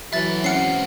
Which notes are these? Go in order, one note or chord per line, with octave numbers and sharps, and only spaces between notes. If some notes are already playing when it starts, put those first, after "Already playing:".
E3 F#3 A4 B4 E5 A6
G#3 C4 C#4 F#5 F6 C7 C#7